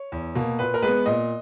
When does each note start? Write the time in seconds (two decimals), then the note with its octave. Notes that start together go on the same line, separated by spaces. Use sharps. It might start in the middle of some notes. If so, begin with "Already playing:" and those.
Already playing: C#5
0.12 E2
0.35 B2 A#3
0.59 A#2 B4
0.74 A#4
0.82 G#3 B3 B4
1.06 A#2 D#5